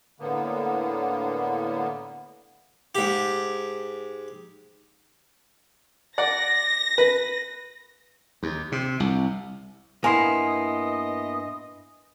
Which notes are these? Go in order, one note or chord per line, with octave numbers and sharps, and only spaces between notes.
A2 D3 A#3 B3
G#2 G4
D5 F#5 A#6
B4
D#2
C3
C2
G2 A#3 B3 E4 D#5 G#5 C6 C7